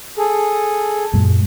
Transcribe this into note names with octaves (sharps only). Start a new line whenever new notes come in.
G#4 A4
F#2 A#2 G#3